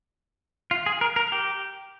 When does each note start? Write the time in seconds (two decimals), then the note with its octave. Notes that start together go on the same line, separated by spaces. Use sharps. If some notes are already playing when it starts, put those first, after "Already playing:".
0.71 F4
0.86 G#4
1.01 A#4
1.16 A#4
1.32 G4